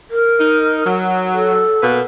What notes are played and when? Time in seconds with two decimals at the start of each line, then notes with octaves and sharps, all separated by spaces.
0.11 A#4
0.40 D#4
0.86 F#3
1.34 A4
1.81 B2 A#3 B4